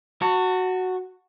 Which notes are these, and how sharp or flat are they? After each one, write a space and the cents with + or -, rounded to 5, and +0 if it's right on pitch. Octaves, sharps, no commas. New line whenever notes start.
F#4 +0 A5 +35